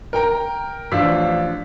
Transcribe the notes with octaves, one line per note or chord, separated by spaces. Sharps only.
A#4 G5 A#5
A1 F3 D4 F5 E6 B6